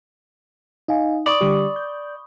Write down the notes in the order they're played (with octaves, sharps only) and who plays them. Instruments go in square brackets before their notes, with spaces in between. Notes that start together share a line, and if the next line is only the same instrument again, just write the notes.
[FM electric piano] D#4 [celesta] D#5 F5 G#5
[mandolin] D5 [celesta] B5 C#6 D#6
[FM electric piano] D3 G3 G4
G6